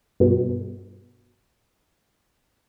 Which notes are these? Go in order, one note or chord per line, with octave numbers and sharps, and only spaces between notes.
G2 B2